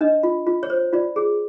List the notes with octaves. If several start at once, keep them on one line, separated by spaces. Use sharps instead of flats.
D4 D#5
F4
F4
C#5
C5
F4 D5
G#4